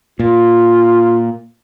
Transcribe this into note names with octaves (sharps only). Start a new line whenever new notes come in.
A#2 F4